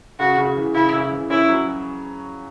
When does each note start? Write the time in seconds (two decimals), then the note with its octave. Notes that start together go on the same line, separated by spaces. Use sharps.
0.19 C#3 F#4
0.38 C#3
0.57 E3
0.74 C#3 E4
0.94 C#3
1.12 E3
1.30 C#4 E4
1.49 F#3